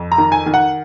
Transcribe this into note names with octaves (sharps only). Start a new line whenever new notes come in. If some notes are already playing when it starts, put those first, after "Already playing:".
Already playing: F2
A#5
D#3
G#5
D#3
F#5